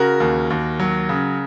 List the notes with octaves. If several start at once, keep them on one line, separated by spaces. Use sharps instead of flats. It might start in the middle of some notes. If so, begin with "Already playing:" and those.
Already playing: C#3 F#4 A#4
D#2
D#2
F#3
C#3